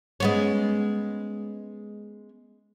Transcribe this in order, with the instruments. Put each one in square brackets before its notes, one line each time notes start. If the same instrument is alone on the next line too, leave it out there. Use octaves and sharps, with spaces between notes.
[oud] G#3 B3 C#4